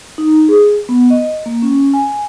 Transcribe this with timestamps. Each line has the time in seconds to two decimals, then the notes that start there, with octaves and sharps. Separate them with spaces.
0.18 D#4
0.49 G#4
0.89 B3
1.10 D#5
1.46 A#3
1.62 C#4
1.94 G#5